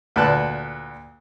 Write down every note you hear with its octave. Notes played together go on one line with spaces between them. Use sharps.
D2 A#2 B4 A5 F#6